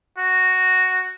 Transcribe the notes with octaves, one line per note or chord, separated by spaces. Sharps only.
F#4